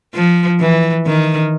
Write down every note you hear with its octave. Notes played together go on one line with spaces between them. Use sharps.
F3
E3
D#3